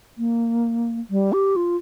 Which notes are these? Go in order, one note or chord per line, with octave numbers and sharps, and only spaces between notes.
A#3
G3
G4
F4